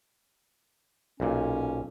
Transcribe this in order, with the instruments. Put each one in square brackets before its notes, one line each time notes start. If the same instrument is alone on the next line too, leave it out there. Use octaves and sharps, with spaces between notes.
[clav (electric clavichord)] B1 A#2 [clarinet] C#4